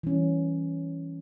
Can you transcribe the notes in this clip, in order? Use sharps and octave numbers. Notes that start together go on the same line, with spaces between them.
E3 G3 C#4